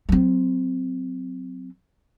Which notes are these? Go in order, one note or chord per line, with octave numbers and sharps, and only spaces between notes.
F#3 C4